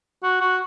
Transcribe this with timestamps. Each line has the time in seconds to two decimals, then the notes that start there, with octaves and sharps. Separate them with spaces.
0.23 F#4
0.41 F#4